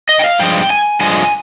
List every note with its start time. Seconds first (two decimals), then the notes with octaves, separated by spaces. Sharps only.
0.09 D#5
0.19 G5
0.24 F5
0.39 G2 F3 G#3 G5
0.70 G#5
1.00 G2 F3 G#3 G#5